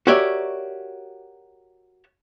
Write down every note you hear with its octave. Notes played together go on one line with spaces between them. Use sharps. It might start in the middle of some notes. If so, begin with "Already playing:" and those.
F#4 G4 A#4 C#5 D5 E5